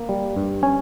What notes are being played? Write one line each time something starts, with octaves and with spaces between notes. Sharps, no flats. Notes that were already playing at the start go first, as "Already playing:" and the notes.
Already playing: A#3
G3
G2
C#4 G#5